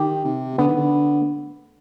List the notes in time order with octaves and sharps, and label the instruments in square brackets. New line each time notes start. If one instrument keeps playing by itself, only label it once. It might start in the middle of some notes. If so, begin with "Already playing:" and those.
Already playing: [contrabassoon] D#3 [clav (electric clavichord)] G4
[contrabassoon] C3
[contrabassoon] D3 [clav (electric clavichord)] B3
[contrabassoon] D#3
D3